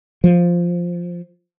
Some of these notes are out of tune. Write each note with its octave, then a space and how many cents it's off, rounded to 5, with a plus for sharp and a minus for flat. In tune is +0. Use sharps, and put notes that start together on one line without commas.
F3 +0